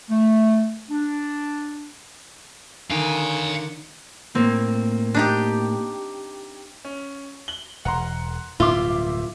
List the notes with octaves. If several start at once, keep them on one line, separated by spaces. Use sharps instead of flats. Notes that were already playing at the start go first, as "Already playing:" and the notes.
A3
D4
D3 D#3 F5 G#5
A2 A#3 C4
D4 D#4 G4
C#4
F#7 G7
E1 F#5 A#5 C6
D1 G2 B2 F4 E5 C6 D6